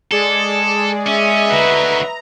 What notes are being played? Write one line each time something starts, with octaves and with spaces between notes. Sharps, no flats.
G#3 G#4 A4 D5
C#4 D#5 E5
D3 F#4 B4 A#5